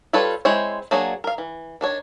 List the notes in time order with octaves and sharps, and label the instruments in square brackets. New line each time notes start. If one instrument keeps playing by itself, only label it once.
[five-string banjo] G3 F4 A4 B4 C#5
G#3 C4 E4 C5 C#5
F#3 A#3 D4 G#4 C#5
A#4 F5
E3
D#3 D4 C#5